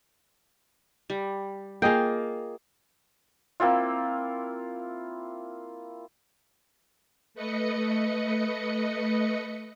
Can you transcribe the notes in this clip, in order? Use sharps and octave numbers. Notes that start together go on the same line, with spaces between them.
G3
A#3 F4 G#4 D#5 G5
A#3 C4 E4 F4
A3 B4 D#5 C#7